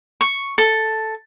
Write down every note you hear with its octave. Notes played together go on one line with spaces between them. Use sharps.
C#6
A4